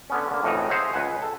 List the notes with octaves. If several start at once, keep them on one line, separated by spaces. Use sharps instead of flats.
D3 B3 C#4
D3 A#3
F2 A2 C#3 E3 D#4
G#4 C5 C#5 E5 F#5 A#5
C#2 B4 F#5 G#5
A4